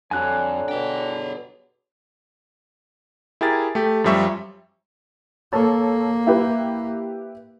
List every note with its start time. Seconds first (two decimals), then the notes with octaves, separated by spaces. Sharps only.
0.11 F2 D3 F#3 G3 C#5 G#5 F#6
0.68 B2 D3 G#4 G5
3.41 E4 G4 G#4 A#4 A6
3.75 A3 G4
4.04 F#2 F3 G3 E5 C#6
5.53 A#3 A4 C#5
6.27 E4 G4 B4